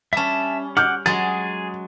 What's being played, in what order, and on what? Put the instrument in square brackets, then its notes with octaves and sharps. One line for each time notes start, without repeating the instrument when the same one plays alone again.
[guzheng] G3 C#4 [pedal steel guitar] E5 A5
[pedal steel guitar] F#5 D6 [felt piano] F6 G6
[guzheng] F#3 G#3 [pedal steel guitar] G#4 [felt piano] A6